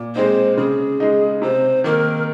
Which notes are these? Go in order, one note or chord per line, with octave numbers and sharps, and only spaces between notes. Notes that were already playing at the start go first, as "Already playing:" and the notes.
Already playing: A#2
G#3 C4 D#4 C5
C#3 G#4
G#3 D#4
C3 C5
D#3 A#3 A#4